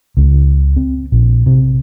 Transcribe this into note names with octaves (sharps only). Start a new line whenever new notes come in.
C#2
C4
A#1
C3